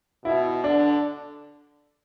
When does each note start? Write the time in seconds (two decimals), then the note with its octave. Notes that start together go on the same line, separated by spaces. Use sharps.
0.24 B2 E4
0.64 D3 D4